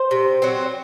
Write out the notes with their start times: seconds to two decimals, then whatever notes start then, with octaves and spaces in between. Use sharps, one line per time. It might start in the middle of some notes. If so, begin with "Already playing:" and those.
Already playing: C5
0.11 C3
0.42 F#3 C4